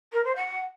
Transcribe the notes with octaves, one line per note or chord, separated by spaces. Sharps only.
A#4
C5
F#5